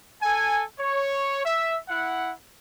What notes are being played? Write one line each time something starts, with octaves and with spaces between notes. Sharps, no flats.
A4 G#5
C#5
E5
E4 F#5